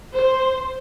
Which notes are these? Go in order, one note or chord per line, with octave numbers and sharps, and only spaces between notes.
C5